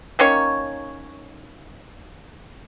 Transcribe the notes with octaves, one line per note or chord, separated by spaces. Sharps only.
D#3 A#3 C#4 C#5